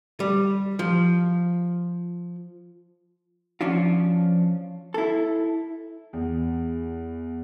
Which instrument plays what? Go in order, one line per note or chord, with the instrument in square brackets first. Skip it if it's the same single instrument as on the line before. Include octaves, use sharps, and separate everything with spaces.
[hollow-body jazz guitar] G3
F3
F3 C#4 D4 F4
E4 A4
[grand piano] E2